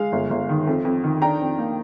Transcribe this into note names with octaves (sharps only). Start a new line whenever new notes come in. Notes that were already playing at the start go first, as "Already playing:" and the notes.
Already playing: G#3 F5
G1
G1
D#3
F2
F2
D#3
D4 G5 A#5
F2
A#3